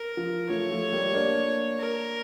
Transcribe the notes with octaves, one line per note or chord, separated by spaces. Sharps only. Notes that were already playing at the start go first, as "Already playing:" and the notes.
Already playing: A#4
F3
F3 A3 C#5
F3 A3
G3 A#3
A#3 D4
A#4